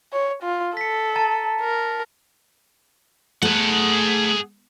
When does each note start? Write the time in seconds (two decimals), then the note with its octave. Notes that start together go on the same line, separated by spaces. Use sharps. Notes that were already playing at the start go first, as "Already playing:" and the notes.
0.13 C#5
0.43 F4
0.77 A4 B6 C#7
1.16 A5 A#5 A6
1.61 A#4
3.42 A3 G#4 B4 F#5